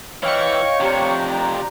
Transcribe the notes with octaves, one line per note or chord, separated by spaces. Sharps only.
E3 C#5 D#5 F5 G5 C#6
F2 C3 D4 G4 A#5